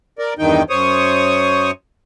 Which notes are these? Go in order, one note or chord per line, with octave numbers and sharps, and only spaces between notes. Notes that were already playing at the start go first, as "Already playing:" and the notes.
A#4 D5
E2 G2 D#3 D#4 G5
F#2 C5 C#5 C#6 D#6